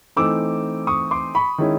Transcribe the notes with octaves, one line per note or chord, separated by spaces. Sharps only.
E3 A3 C4 D#4 D6 E6
C#6 D#6
C6 D6
B5 C#6
D#3 G#3 C#4 E4